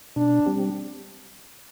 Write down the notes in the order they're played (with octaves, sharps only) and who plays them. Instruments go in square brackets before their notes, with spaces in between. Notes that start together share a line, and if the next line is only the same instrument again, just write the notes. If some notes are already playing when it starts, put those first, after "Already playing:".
[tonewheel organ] B2 [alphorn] D4
[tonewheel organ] G3 C4 G4